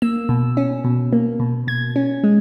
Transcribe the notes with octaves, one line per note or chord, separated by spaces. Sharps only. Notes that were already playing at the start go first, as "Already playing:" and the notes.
A#3 E6
B2
C#4
B2
A#3
B2
B2 G#6
C#4
G#3